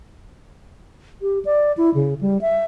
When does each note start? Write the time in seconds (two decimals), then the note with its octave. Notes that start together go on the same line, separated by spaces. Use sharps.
1.22 G4
1.45 D5
1.77 E4
1.94 C#3
2.21 G3
2.41 E5